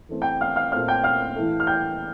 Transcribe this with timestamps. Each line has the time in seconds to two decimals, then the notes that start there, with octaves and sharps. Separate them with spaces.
0.09 E3 A3 C4
0.22 G5 G6
0.41 F5 F6
0.56 F5 F6
0.72 A#2 A3 C4 F5 F6
0.88 G5 G6
1.03 F5 F6
1.35 A2 E3 A3
1.60 F6
1.67 G5 G6